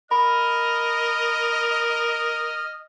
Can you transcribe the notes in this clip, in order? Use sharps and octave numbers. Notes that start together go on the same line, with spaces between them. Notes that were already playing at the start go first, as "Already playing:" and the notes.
A#4 D#5 B5 F6